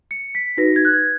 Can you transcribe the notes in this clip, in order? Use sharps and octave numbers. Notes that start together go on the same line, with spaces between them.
C#7
B6
D#4 F#4 B4 A#6
G#6
F#6
G#6